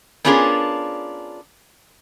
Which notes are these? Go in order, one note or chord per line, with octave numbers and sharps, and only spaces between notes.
B3 C#4 D4 F4 G#4 A#4